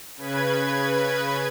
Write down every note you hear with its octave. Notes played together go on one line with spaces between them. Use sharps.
C#3 B4 G#6